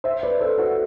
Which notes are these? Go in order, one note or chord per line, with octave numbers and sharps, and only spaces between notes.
C5 E5
B4 D5
A4 C5
F#4 A4